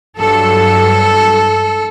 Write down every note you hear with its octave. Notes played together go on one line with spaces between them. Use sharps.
G2 F#3 A4